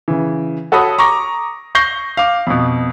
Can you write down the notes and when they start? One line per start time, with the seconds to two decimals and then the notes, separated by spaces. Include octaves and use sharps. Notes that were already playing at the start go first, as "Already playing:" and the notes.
0.08 C#3 E3
0.72 F#4 A4 C#5 B5 D#6
0.98 A#5 C#6 D6 A#6
1.75 C#6 G6 A#6 C7 G7
2.17 F5 D6
2.47 F2 B2